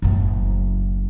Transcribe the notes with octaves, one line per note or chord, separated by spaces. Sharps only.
F#1 A2